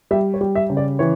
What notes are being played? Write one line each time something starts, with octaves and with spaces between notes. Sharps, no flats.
G3 E5
C#5
G3
E5
C#3
D5
E3 C#5